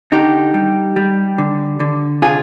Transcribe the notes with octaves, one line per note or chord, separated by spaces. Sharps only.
D3 D#4 G4
G3
G3
D3
D3
C3 F4 G#4